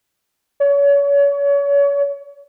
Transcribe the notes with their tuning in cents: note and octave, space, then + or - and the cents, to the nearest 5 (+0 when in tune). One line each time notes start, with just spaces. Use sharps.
C#5 +35